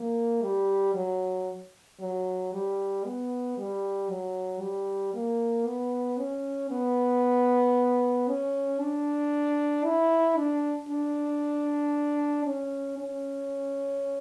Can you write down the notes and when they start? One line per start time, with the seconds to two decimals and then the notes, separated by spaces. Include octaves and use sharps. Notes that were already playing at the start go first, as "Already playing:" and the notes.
Already playing: A#3
0.42 G3
0.95 F#3
2.00 F#3
2.52 G3
3.05 B3
3.57 G3
4.09 F#3
4.61 G3
5.14 A#3
5.66 B3
6.18 C#4
6.71 B3
8.28 C#4
8.80 D4
9.85 E4
10.37 D4
10.89 D4
12.46 C#4
12.98 C#4